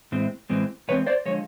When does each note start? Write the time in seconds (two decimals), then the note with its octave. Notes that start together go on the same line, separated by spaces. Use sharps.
0.12 A2 E3 G#3 C4
0.50 A2 E3 G#3 C4
0.88 A2 E3 G#3 C4 B4 C#5
1.07 C5 D5
1.26 D3 F3 G#3 C#5